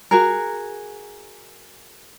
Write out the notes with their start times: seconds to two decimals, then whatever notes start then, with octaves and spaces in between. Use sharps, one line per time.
0.11 F#4 G#4 A#4